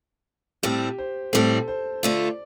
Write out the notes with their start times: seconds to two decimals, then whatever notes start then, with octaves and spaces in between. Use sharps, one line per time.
0.63 A2 G3 C4 G4
0.98 C5
1.33 A2 G3 C4 A4
1.68 C5
2.03 D3 A3 F4 D5